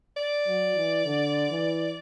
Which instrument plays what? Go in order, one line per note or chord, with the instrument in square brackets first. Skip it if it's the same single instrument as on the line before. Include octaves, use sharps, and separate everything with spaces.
[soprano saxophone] D5
[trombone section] F#3
E3
D3
E3